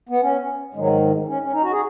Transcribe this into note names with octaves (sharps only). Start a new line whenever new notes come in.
B3
C#4
G#2 D#3 F#3 G#3
F#3
G#3
C#4
C#4
D#4
F#4
G#4